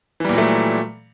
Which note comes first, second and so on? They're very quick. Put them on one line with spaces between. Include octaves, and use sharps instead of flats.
E3 G3 A#2 F#3 A3